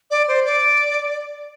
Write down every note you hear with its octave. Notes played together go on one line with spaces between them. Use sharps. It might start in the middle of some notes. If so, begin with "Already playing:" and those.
D5
C5
D5